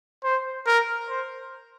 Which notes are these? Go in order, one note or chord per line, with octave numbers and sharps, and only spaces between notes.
C5
A#4
C5